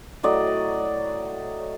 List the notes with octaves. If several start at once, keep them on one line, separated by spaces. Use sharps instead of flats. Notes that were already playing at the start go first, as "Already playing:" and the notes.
A2 F#3 D5 D#5